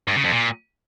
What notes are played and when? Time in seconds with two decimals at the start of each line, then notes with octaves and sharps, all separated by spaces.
0.08 G2
0.16 C#3
0.24 F2
0.32 A#2